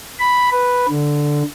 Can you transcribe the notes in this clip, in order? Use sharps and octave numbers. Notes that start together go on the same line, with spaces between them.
B5
B4
D3